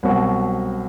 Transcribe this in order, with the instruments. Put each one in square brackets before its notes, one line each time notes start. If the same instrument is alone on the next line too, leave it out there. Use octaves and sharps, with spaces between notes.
[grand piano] C2 B2 F#3 C4 F#4